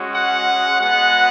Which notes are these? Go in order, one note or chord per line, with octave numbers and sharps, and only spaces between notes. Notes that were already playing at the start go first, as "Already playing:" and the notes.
Already playing: G#3 C#4 F#4
F#5
G#3 B3 F#4 F#5